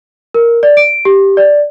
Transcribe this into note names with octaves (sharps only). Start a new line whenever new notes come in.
A#4
D5
D7
G4
D5